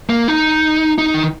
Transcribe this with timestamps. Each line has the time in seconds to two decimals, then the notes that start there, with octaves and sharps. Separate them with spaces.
0.09 A#3
0.28 D#4
0.98 D#4
1.14 D#3